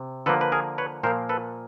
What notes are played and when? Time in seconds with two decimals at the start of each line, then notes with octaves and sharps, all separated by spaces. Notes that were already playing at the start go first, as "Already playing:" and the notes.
Already playing: C3
0.26 D3 F3 A#3 A4 B4
0.41 B4
0.52 G#4 A#4
0.78 B4 C#5
1.03 A#2 F3 A#3 A#4 C5
1.29 A4 B4